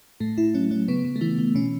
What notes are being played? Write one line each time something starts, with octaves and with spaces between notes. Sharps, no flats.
A2 A3
A2 E4
F#3 C#4
F#3 C#4
C#3 B3
C#3
A3
E3 B3
E3
B2 C#4